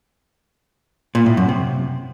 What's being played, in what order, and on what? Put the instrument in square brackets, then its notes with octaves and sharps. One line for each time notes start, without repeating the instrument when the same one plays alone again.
[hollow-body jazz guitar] A#2
A2
F#2
C3